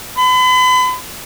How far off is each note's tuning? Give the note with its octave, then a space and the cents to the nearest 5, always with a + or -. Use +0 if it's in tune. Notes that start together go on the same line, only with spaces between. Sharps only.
B5 +40